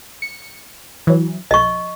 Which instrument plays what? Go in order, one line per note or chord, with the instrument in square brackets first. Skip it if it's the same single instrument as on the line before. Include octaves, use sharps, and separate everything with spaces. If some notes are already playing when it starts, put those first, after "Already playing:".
[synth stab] C#7
E3 F#3
[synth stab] B1 [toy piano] D#5 C#6